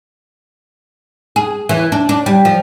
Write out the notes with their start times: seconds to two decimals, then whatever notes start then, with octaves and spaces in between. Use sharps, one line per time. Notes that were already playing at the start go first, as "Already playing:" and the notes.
1.36 G#4
1.69 E3
1.92 D4
2.09 D4
2.26 G3
2.45 F3